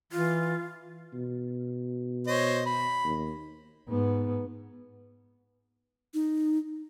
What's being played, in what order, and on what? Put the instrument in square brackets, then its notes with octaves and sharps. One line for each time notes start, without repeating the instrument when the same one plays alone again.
[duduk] E3 [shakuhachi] F4
[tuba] B2
[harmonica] C5 C#5 D#5
B5
[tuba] D#2
[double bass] G#2 B3
[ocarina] D#4